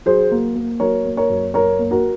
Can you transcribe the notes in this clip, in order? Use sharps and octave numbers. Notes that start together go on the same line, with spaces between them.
F#3 G#4 C5
A#3
A#3
F#3 A#4 C#5
A#3
A#4 C#5
F#2
F#3 A#4 C#5
A#3
F#4 A#4